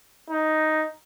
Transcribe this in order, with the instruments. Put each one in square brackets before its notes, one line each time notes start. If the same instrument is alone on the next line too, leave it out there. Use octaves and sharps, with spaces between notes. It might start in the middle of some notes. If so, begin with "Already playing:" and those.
[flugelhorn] D#4